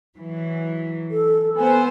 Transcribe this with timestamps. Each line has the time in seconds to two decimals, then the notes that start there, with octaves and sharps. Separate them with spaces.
0.17 E3 F#3
1.11 A4
1.57 B3 C5 G#5